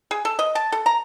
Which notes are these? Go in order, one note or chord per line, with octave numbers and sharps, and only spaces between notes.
G#4
A4
D#5
A5
A4
A#5